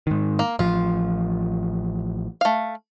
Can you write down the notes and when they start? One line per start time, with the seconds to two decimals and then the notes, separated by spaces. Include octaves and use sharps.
0.07 G#2 D#3
0.39 A#3
0.59 A1 F3 F4
2.41 A3 F5